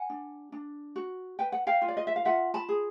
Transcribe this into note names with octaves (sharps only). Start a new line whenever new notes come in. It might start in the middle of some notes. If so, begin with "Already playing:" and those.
Already playing: F#5 G#5
D4
D4
F#4
B4 G5
F#5
F5 G5
F4
D5
D#5
E5
F5
F4 E5 F#5
A5 B5
G#4